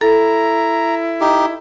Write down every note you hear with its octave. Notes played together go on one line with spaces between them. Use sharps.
E4 A4 A#5
D#4 G4